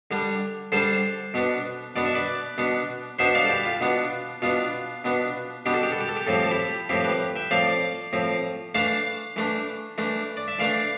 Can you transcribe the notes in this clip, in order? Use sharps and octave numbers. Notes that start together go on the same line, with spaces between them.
D3 G3 D4
D3 G3 D4 A4 C5
B2 B3 D4
B2 B3 D4 D5
E5
B4 D5
B2 B3 D4
B2 B3 D4 C5 E5
D5 F5
A4
E4 G4
F4
B2 B3 D4
B2 B3 D4 F4
B2 B3 D4
B2 B3 D4 G4
A4
G4
A4
G4
A4
G4
A2 F3 C4 A4
G4
A4
E4 G4
A2 F3 C4 E4 G4
G4 B4
E5 G5
A2 F3 C4 D5 F5
A2 F3 C4
E3 A3 D4 F5 A5
E3 A3 D4
E3 A3 D4
D5
E5
E3 A3 D4 D5 F5